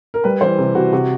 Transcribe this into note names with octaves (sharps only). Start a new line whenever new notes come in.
A#4
G3 B4
E3 C5
C3
C3 F#4
C3 F#4